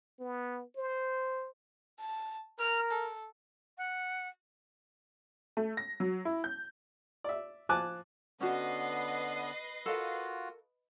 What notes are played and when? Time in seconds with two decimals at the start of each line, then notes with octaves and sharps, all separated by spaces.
0.19 B3
0.76 C5
2.00 A5
2.60 A#4 F6
2.91 A4
3.78 F#5
5.57 A3
5.77 A#6
6.00 F#3
6.25 E4
6.44 G6
7.24 D5 E5
7.69 F3 G#5 A5 D6 F#6
8.40 D3 B3 C#4 F#4 B4 D#5 C7
9.86 F4 F#4 A4 A#4 F5